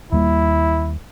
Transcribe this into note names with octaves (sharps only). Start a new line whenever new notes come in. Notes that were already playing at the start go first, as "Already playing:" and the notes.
D#2 G3 A#3 E4